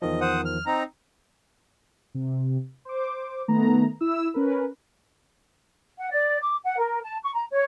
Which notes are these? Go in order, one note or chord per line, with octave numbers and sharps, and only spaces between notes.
E2 D#3 F3 D#5
C5 F#5 D#6
F6
C4 D#4 A#5
C3
C5 D6
D#3 A3 B3 A#5
E4 E6
C#4 A#4 B4
F#5
D5
D6
F#5
A#4
A5
C#6
A#5
C#5